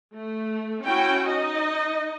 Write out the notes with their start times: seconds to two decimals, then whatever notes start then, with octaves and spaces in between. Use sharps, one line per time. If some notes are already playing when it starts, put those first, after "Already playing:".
0.12 A3
0.85 C#4 E4 F#4 G5
1.30 D#4 D#5